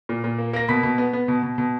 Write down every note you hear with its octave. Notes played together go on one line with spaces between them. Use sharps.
A#2
A#2
A#3
A#3 A#6
B2 B5 B6
B2
B3
B3
B2
B2
B2